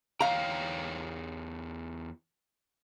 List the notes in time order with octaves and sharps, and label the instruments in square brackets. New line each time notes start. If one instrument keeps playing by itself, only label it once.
[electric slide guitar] E2 C#5 G5 [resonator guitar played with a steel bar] F5 A#5